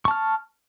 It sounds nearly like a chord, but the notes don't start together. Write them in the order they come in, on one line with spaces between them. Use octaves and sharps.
C#6 A5 F6